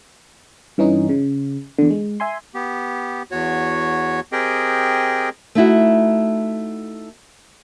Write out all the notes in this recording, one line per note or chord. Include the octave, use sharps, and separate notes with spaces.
G2 E3 C#4 D#4
C#3
E2 D3
G#3
E5 G#5 C6
B3 G4
E2 F#4 C#5
C4 G4 G#4 A#4 D#5 G5
A3 D#4 E4 F#4